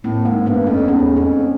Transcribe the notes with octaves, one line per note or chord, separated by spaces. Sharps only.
A2 A#3 C4
G#2 G#3 A#3
G2 A3 B3
F2 B3 C#4
E2 C#4 D#4
F2 C4 D4